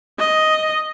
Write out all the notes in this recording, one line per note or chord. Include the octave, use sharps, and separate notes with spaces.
D#5